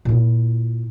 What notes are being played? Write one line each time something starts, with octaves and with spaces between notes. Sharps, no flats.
A#2 E4